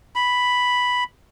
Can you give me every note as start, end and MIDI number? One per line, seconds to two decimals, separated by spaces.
0.15 1.04 83